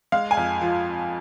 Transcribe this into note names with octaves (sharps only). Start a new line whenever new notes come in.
G#3 F5
G#5
F2
F3